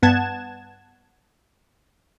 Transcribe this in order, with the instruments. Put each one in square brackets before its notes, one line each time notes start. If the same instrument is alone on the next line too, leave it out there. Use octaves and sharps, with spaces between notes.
[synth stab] G2 B3 F#5 A5 G#6 E7